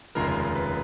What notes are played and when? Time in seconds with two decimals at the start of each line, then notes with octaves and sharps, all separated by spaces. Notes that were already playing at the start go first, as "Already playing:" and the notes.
0.15 F1 D#2 C#3 F3 G#3 A#4
0.29 A#4
0.55 B4